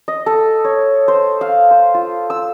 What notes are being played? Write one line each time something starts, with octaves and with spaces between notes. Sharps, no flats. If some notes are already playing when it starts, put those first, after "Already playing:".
D#5
A4
C#5
C5
F5
C5
F4
E6